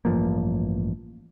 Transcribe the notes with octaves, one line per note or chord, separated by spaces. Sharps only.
A1 G2 F3 A#3